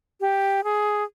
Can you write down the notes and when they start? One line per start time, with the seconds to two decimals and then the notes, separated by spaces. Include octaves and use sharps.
0.21 G4
0.64 G#4